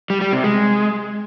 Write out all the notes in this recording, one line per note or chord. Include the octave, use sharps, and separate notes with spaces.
G3
G3
C3
G#3